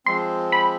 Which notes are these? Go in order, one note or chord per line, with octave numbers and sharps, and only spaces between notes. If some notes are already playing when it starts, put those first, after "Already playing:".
F3 G#3 C4 C6
B5